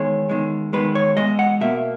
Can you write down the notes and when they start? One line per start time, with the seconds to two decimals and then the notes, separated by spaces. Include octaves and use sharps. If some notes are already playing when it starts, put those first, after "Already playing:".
Already playing: E2 D#3 G#3 C#5
0.29 E2 D#3 G#3
0.73 E2 D#3 G#3 B4
0.95 C#5
1.17 E2 D#3 G#3 D#5
1.39 F#5
1.61 B2 A#3 E5